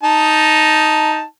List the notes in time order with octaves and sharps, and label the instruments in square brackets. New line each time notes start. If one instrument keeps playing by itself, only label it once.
[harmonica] D#4 A5